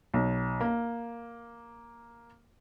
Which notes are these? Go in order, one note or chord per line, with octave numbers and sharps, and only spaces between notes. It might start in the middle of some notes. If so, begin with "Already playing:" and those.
B1
A#3